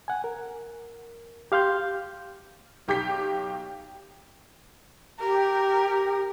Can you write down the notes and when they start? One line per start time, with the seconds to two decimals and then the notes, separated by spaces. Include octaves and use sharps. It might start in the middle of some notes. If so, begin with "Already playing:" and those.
0.08 F#5 G#5
0.24 A#4
1.52 G4 F5 C6 G6
2.88 B1 G4 D6 G6 B6
5.20 G4 A#4